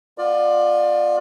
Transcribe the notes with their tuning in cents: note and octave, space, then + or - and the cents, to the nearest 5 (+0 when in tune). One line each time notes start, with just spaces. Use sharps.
B3 +0 F4 +20 D5 +25